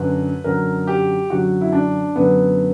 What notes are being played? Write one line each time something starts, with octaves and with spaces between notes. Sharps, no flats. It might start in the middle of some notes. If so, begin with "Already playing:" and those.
Already playing: F#2 D3 F#3 B4
F#2 D3 F#3 A#4
G4
F#2 D3 F#3 F#4
E4
D4
F#2 D3 F#3 B3